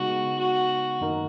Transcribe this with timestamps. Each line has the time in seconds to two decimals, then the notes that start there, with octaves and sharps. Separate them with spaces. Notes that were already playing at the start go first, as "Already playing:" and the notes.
Already playing: C#3 G#3 B3 D#4 F#4
0.40 F#4
1.01 F#2 D#3 A#3 D#4 A#4